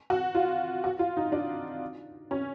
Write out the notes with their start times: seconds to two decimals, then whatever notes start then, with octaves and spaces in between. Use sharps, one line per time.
0.10 F#4
0.35 F4
0.84 F#4
0.99 F4
1.17 D#4
1.32 D4
2.31 C#4